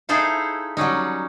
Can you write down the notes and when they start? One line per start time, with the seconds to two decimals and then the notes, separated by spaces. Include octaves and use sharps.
0.09 D#4 E4 G#4 A4 C5 F5
0.77 F#3 G3 C#4 D#4